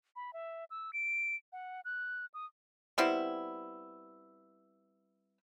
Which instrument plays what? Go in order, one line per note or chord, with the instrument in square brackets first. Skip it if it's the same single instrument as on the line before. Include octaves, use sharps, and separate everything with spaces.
[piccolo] B5
E5
E6
D7
F#5
F#6
D#6
[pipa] G3 B3 C4 E4